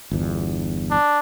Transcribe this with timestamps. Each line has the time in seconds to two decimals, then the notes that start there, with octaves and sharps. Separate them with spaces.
0.11 G1 E2
0.91 D4